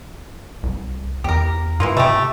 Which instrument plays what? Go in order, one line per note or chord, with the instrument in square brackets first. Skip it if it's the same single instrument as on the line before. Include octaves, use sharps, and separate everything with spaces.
[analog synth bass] C2
[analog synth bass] E2 [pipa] G4 A#4
[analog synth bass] G#2 [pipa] E3 A#3 F4
[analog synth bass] C3 [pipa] A3 G4